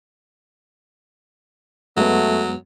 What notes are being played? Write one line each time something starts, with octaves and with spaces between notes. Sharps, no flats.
F#2 F#3 G#3 A3 B3